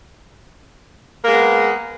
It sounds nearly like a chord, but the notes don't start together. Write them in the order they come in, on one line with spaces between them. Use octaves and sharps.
A#3 G#3 B3